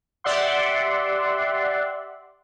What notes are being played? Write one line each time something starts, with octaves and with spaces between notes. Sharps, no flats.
G4 D5 E5 F#5 C6